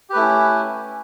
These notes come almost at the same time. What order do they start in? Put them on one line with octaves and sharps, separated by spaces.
G4 B4 A3 E4 C#4